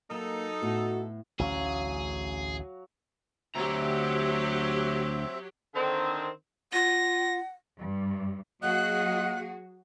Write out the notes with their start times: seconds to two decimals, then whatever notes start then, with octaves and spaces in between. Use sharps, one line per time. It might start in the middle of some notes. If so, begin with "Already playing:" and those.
0.11 F#3 A#3 D#4 A4
0.62 A2 B3 F#4
1.39 A1 D2 F#3 C#4 G#4 F5
3.55 D2 F#3 C4 G4 E5 A#5
5.75 D3 D#3 C4
6.73 F4 F#5 A#6
7.79 G2
8.63 F#3 A#3 F#4 G#4 D#5 F#5 F#6